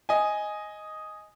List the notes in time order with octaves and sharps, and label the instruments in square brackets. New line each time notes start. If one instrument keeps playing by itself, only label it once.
[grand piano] D#5 G#5